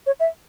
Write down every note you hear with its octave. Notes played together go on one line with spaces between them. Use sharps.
C#5
E5